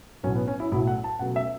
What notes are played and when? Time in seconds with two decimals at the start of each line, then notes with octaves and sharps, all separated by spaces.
0.23 B1 A2 F#3 A3 C#4
0.35 B3
0.47 C#4
0.60 E4
0.71 B1 A2 F#3 A3 E4
0.87 F#5
1.04 A5
1.19 C#2 B2 F#3 A3 F#5
1.36 E5